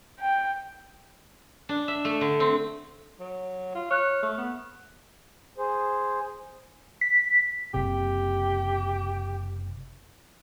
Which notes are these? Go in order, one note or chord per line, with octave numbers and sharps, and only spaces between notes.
G5
D4
E5
A3
D3
C4
F#3
F4
C#5 F6 F#6
A3
B3
G#4 C5
B6
F#1 C3 G4